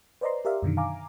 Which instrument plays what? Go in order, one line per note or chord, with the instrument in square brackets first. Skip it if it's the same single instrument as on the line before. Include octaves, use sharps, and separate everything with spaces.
[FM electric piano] B4 C5 D5 D#5 A#5 C6
G4 A#4 D5 E5 F5
F#2 B2 D3 D#3
F5 G#5 A#5 D6